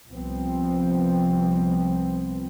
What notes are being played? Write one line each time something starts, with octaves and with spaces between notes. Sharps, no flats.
C2 F3 B3 C4